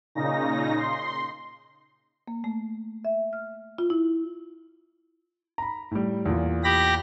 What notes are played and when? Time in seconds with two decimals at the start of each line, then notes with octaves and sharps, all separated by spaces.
0.15 A#2 C#3 D#4 A#6
0.77 C6
2.28 A#3
2.44 A3
3.05 E5
3.33 F6
3.78 F4
3.90 E4
5.58 A#5 B5
5.91 A2 G3
6.26 E2 A#2
6.64 G4 B5 A#6